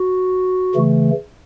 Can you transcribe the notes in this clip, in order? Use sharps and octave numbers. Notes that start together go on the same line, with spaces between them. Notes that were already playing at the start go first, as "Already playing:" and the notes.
Already playing: F#4
C#3 E3 A3